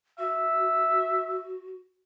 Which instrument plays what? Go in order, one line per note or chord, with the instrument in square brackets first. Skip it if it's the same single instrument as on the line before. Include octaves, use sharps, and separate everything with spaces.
[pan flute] F#4 [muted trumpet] E5